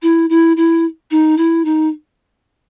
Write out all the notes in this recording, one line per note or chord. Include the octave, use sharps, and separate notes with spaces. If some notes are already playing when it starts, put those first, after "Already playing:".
E4
E4
E4
D#4
E4
D#4